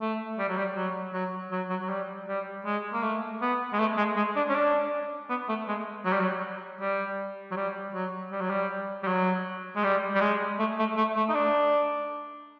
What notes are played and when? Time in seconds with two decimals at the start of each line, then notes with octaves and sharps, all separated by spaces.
0.01 A3
0.38 G3
0.48 F#3
0.58 G3
0.76 F#3
1.13 F#3
1.52 F#3
1.70 F#3
1.81 F#3
1.89 G3
2.28 G3
2.66 G#3
2.93 A#3
3.03 A3
3.41 B3
3.73 G#3
3.79 A3
3.97 G#3
4.16 G#3
4.36 D4
4.49 C#4
4.55 D4
5.29 B3
5.49 A3
5.68 G#3
6.05 F#3
6.13 G3
6.20 F#3
6.81 G3
7.51 F#3
7.57 G3
7.94 F#3
8.32 G3
8.41 F#3
8.50 G3
9.03 G3
9.08 F#3
9.76 G#3
9.84 G3
10.15 G3
10.21 G#3
10.59 A3
10.79 A3
10.97 A3
11.16 A3
11.29 D#4
11.34 D4